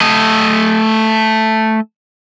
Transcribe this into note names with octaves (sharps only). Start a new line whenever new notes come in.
A3 D#5